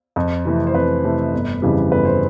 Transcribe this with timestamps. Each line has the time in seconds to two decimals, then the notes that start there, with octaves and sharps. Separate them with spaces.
0.16 F2
0.45 C3 E3 A3
0.67 C5
0.74 F2 B4
1.04 C3 E3 A3
1.33 G1
1.62 F2 C#3 E3 G3
1.92 G1 B4
2.05 C5